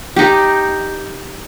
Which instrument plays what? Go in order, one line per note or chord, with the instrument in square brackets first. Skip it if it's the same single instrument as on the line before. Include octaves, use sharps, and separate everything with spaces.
[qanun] D#4 G4